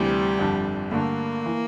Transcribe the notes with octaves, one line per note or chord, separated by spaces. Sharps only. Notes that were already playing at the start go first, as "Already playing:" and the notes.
Already playing: D2 C3 E3 G3
G1 F2 D3
G2 D3 A3 A#3
E3